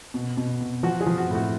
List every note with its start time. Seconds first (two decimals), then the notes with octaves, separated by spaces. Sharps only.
0.14 B2
0.37 B2
0.60 B2
0.83 F3 F#4
1.01 G#4
1.06 F3
1.18 F#4
1.30 A2
1.35 F#4